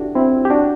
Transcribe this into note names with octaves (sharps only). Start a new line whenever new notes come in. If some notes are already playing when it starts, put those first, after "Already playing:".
Already playing: D4 E4 F#4 G4 A4
C4 E4
G4
D4 F#4